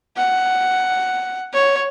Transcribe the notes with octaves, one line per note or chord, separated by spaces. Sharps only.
F#5
C#5